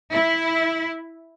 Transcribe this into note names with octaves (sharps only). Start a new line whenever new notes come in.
E4